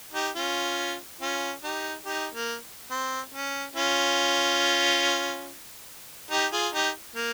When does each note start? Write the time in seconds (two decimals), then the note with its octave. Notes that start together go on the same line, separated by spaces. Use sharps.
0.14 D#4 G4
0.36 C#4 F4
1.21 C#4 F4
1.64 D#4 G4
2.06 D#4 G4
2.35 A#3
2.91 C4
3.34 C#4
3.76 C#4 F4
6.31 D#4 G4
6.53 F4 G#4
6.74 D#4 G4
7.16 A#3